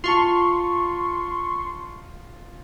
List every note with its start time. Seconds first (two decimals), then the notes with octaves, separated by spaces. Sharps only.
0.04 F4 A5 C6 C#6 F7